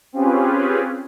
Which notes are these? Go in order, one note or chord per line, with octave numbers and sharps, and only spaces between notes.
C4 C#4 F4 G4 G#4 B4